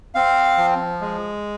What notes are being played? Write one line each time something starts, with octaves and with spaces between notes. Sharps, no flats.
C4 F5
F3
G#3